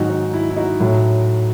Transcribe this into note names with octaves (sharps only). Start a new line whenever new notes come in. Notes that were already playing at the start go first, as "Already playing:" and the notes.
Already playing: G#2 D#3 F#3 D#4 F#4
D#4
E4
E4
D#4 F#4
A2 F#3